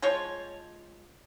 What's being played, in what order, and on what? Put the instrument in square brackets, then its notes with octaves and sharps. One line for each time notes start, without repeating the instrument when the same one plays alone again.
[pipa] F3 G#3 F4 C#5